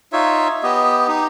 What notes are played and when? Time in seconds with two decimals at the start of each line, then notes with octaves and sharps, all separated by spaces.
0.13 D#4 F4 C#5 E5
0.63 B3 G4 D#5
1.08 D#4 G4